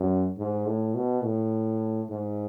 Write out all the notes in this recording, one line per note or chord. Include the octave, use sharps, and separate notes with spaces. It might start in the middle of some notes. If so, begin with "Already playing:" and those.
Already playing: F#2
G#2
A2
B2
A2
G#2